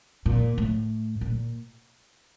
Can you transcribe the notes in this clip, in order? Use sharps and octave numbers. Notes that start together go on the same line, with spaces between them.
A#2
A2
A#2